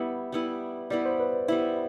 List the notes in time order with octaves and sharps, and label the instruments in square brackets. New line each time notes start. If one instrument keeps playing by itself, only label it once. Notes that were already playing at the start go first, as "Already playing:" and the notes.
Already playing: [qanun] G3 B3 E4 [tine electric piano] B4
[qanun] G3 B3 E4
[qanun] G3 B3 E4 [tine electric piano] D5
[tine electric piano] C5
B4
[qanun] G3 B3 E4 [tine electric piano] E5